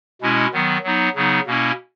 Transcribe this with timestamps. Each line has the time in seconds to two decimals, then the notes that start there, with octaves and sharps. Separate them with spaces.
0.22 B2 G#3 C#4 E4
0.53 D#3 F#3 B3
0.84 F#3 B3 D#4
1.15 C#3 F#3 B3 D#4
1.46 B2 A#3 C#4 E4